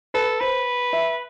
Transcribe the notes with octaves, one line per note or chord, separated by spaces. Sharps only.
A4 B4
B4 C5
E5